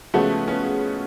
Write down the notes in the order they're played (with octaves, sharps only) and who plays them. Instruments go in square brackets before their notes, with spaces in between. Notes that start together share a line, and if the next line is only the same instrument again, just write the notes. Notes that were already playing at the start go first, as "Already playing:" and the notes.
[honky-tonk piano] C#3 F3 G#3 C#4 F#4 [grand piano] A3 B3
[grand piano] B3 C#4